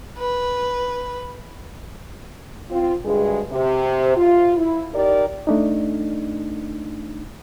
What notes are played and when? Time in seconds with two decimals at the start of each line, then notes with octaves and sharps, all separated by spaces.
0.17 B4
2.70 C4 F4
3.04 D2 G2 G#3 G#4
3.51 C3
4.17 F4
4.56 E4
4.94 D#4 G4 A#4 D5
5.47 A3 D4 D#4